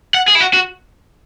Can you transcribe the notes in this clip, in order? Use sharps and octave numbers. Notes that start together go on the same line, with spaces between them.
F#5
G#4
E4
F#4
F#4